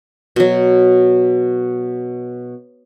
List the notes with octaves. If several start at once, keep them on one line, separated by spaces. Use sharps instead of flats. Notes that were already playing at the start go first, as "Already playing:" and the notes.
B2 F#3